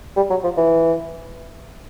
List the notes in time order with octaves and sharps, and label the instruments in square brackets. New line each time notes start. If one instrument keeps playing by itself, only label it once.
[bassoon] G3
F#3
F3
E3